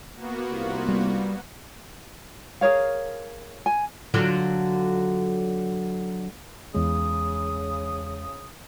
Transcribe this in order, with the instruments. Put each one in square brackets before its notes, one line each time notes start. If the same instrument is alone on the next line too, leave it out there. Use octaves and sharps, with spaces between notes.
[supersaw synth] A#3 B3 F#4
[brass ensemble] C2 F4
[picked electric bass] G3
[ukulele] G#4 A#4 C#5 F5
G#5
[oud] D3 F#3 F4
[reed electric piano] E2 G#3 [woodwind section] C#3 D#6